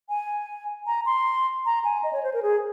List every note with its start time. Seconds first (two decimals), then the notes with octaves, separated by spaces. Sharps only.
0.09 G#5
0.87 A#5
1.06 C6
1.66 A#5
1.84 G#5
2.03 D#5
2.13 C#5
2.23 C5
2.34 A#4
2.43 G#4